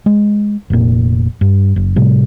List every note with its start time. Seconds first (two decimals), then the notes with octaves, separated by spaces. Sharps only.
0.06 G#3
0.70 F1 A#2
1.41 G2
1.76 F#1
1.96 A2 C3 G3